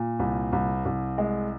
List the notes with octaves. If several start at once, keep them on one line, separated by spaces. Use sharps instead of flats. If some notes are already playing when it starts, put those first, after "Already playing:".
Already playing: A#2
C2
C2
C2
G#3